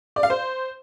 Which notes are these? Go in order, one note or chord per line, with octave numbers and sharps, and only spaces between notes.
D5
F5
C5